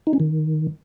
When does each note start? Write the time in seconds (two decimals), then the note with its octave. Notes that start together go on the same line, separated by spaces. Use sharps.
0.07 D#4
0.13 C#4
0.20 D#3